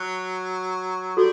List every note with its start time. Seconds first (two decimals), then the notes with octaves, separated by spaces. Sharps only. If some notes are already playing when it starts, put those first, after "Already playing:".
Already playing: F#3
1.17 G3 F#4 A4